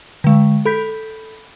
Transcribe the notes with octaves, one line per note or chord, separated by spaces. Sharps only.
D3 G#3
A4 B5 G6 B6